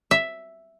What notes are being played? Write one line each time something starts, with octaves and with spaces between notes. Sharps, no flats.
E5